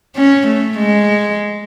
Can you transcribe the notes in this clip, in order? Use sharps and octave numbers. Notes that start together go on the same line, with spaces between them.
C#4
A3
G#3